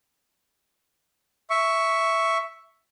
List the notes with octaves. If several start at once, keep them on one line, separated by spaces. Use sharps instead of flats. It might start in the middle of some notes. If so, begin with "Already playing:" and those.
E5 C#6